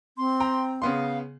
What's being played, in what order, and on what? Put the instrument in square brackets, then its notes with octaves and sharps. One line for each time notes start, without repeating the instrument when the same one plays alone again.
[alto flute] C4 [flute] C6
[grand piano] G5 A#5
[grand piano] C#3 B3 C6 [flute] F5